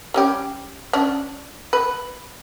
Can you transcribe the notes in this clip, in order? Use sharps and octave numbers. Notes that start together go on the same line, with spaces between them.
G3 C#4 G4
C#4 D4
B4